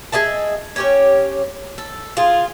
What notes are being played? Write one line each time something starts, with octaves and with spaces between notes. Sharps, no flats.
G#4 D#5 E5 A5
C#4 G4 C#5
A4
F4 G#4